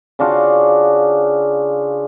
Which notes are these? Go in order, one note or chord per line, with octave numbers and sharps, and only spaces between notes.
C#3 D4 F4 F#4